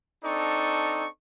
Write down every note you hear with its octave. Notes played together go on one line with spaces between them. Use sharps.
C4 D4 D#4 A4 C#6